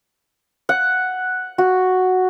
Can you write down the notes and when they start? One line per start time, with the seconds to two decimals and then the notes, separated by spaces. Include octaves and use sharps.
0.69 F#5
1.58 F#4